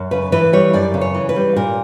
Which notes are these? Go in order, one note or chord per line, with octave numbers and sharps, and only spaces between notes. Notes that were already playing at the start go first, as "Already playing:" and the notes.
Already playing: F#2
C#3 B4
E3 B4
G3 C#5
F#2 D5
C#3
C#5
E3
B4
G3
A#2 A#4